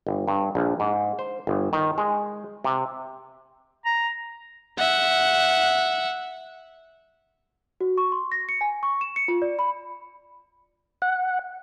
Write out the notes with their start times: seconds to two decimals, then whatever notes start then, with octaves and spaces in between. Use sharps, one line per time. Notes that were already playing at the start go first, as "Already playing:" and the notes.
0.07 G1
0.28 G2
0.55 A#1
0.80 G#2
1.19 C5
1.47 G1
1.73 D#3
1.98 G#3
2.64 C3
3.85 A#5
4.78 E5 F#5
7.81 F#4
7.98 C#6
8.12 C6
8.32 A#6
8.49 C#7
8.61 G#5
8.83 C#6
9.01 E7
9.16 C#7
9.28 F4
9.42 D5
9.59 B5
11.02 F#5